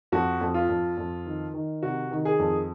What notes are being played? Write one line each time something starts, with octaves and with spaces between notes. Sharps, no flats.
F2 F#4
F2
F4
F2
F2
D#3
D#3
C3 F#4
D#3
G#4
F2